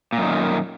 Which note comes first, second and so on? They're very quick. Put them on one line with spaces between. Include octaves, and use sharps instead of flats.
A#2 F#2 D#3